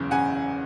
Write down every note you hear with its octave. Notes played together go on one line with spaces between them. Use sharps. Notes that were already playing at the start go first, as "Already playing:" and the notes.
Already playing: F#1 E2 C#3
C#3 F#5 G#5